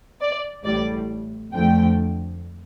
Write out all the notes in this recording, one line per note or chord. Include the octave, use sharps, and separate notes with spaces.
D5
A1 A2 G3 D5
F2 D3 F3 A3 G5